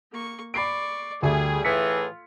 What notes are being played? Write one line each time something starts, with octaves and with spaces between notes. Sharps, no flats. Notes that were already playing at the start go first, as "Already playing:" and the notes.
A#3 C#6
D5 B5 C#6 C7 D7
D2 G3 A3 G#4
A2 E3 F4 G#4 B6 C#7